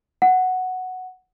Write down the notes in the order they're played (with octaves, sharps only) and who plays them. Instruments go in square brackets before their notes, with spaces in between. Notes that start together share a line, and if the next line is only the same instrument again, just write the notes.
[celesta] F#5